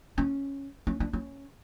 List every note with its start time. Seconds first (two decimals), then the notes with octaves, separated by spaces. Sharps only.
0.18 C#4
0.87 C#4
1.00 D4
1.13 C#4